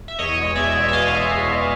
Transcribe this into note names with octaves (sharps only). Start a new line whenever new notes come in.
E5
E2 C#5 D#5
B2 G#3
E2 D5 E5
B2 G#3
E5
E2 D#5 F5
B2 G#3
E2
B2 G#3